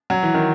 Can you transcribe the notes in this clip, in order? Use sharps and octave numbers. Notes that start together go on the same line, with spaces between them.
F#3
E3
D#3